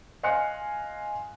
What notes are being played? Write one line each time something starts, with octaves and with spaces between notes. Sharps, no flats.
D#5 F5 G#5 C6 F#6 C#7